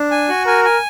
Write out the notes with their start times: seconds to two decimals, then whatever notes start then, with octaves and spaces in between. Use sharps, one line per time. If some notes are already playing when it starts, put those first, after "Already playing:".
Already playing: D4
0.11 G#5
0.29 F#4
0.46 A#4 G#5
0.65 G#5